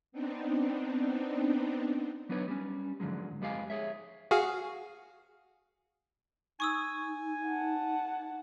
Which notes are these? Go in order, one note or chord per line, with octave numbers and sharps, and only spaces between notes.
B3 C4 D4 D#4
F#3 B3 D4 D#4 B4 C#5
G3 C#4
G#2 D3 F3 F#3 G#3
F2 G#3 G4 D#5 F5 G#5
G#4 C#5 E5
F#4 G#4 F5
D#4 G#5 C#6 D#6 E6
F#5 A5